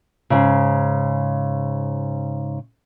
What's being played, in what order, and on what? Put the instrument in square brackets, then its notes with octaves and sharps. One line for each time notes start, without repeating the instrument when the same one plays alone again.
[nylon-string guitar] G#2 C#3